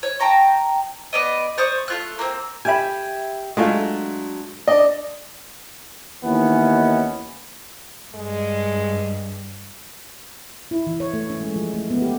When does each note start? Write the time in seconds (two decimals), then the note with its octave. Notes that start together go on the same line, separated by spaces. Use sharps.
0.03 C#5
0.20 G5 A5 A#5 C#6
1.13 B3 D5 D#5
1.58 C5 D5 C#6 D#6
1.88 A3 F4 F#6
2.19 A#3 C4
2.65 G4 E5 G#5 B5
3.57 F#3 G#3 A3 D4 F4
4.68 D4 D5 D#5
6.24 D#2 D#3 E3 B3 C#4
8.15 G2 G#3
10.71 E4
10.87 E3
11.00 C#5
11.13 A3
11.30 C#4
11.41 G#3
11.56 F3
11.74 A3
11.90 B3
12.02 G4